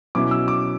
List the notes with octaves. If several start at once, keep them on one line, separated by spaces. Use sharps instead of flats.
B2 F#3 C#4 E4 D6
E6
D6